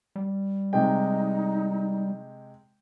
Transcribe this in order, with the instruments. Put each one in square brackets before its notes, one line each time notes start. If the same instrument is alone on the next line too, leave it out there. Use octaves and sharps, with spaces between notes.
[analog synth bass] G3
[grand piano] C3 G#3 G5 [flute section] D#4